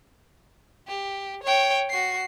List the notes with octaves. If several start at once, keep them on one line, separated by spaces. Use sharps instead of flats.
G4
C#5 G5
F#4 C7